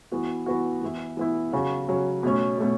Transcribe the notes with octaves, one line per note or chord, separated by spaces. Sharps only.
E3 B3 F#4
E3 B3 F#4
E3 B3 E4
E3 B3 E4
C#3 F#3 C#4 F#4
C#3 F#3 C#4 F#4
B2 A3 C#4
B2 A3 C#4